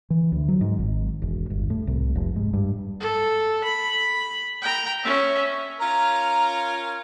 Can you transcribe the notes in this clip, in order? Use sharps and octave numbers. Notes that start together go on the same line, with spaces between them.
E3
D2
F#3
G#2
G#1
E1
G1
A2
C2
F1
G#2
G2
A4
B5
G5 A#5
C#4 E5
C#4 F4 A#4 A#5